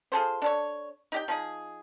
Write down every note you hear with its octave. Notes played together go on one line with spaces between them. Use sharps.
F4 G#4 A4 C5
D4 A4 C#5
D#4 G4 G5
F3 D#4 G#4